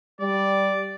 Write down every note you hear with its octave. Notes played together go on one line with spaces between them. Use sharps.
G3 D5